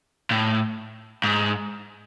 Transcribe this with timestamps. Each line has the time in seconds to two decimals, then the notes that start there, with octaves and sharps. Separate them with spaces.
0.31 A2
1.24 G#2